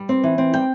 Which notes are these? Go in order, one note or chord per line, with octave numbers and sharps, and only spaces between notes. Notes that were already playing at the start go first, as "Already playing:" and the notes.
Already playing: G3
C4
E3
C4
G3 G5